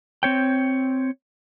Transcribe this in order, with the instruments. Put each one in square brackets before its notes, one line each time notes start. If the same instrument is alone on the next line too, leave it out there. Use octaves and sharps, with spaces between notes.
[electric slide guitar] C4 C#5 G5